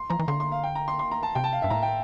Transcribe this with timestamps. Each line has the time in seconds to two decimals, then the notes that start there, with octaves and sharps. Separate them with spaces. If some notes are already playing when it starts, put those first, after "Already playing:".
Already playing: C6
0.10 F3 A#5
0.19 E3
0.28 D3 C6
0.40 C6
0.52 F5
0.63 G5
0.75 A#5
0.88 C6
0.99 C6
1.11 A#5
1.23 A5
1.35 C3 G5
1.44 A5
1.53 F5
1.62 G2 E5
1.70 A2 A#5
1.83 G5